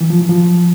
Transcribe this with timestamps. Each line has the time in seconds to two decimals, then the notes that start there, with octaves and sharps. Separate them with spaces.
0.01 E3
0.10 F3
0.20 F#3
0.29 F3